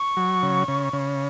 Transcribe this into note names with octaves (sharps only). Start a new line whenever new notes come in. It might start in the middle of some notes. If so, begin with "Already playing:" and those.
Already playing: C#6
F#3
C#3
C#3
C#3